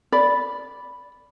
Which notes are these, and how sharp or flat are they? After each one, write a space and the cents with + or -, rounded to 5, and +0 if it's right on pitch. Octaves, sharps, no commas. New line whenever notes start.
D5 -10 B5 +0